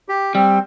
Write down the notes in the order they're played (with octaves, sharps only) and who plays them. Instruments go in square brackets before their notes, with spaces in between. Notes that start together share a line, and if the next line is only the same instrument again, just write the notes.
[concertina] G4
[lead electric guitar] G3 [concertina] C4